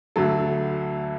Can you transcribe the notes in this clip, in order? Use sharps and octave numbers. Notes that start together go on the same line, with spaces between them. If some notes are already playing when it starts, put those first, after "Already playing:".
D2 D3 F#3 A4